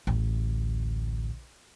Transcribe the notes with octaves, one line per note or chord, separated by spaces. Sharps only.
A1 D2